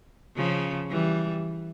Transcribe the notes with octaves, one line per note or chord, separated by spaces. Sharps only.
C#3 F3
E3 G3